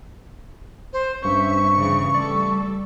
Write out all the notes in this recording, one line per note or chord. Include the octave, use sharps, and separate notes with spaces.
C5
G2 C#4 C5 E5 C#6
C#3 E3 G3
G3 A3 A4 D5